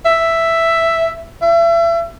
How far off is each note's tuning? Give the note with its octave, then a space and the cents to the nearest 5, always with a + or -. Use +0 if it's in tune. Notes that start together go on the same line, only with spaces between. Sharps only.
E5 +5
E5 +35